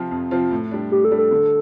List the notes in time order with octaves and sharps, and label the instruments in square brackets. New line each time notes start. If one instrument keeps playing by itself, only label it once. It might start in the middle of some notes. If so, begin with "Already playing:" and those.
Already playing: [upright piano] C3 F3 C4 F4
F2
C3 F3 C4 F4
A2
G3 D4
[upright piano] A2 [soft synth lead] G4
[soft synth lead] A4
[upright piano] G3 D4
[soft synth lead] A4
[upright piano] D3